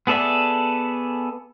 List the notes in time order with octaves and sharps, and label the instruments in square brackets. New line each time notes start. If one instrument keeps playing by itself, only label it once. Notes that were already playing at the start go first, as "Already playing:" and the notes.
[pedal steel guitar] B3 G#4 A4 D5 E5